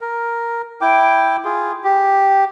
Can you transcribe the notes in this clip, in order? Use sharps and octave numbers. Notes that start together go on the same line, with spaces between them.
A#4
E4 G5 D6
F4 G#4
G4